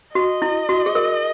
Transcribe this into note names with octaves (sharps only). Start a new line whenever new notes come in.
F#4 D#5
E4
F#4
G#4
A#4